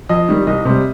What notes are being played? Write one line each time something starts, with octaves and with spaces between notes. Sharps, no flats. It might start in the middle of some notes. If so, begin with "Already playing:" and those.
F2 D#5
D#3 G3
C2 D#5
C3 G3